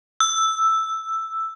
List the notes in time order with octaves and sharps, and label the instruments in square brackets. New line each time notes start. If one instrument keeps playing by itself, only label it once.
[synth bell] E6